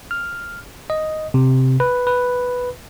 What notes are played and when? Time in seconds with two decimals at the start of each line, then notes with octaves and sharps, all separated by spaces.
0.11 F6
0.90 D#5
1.34 C3
1.80 B4
2.07 B4